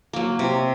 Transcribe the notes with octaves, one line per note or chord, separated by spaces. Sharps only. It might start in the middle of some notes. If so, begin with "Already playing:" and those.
F#3 A#3
C3